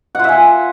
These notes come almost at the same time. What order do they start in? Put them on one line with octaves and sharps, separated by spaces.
F#5 F4 E5 G#5